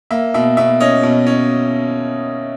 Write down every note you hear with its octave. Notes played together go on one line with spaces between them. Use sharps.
A#3 E5
B2 E5
B2 E5
C#4 D#5
B2
C#4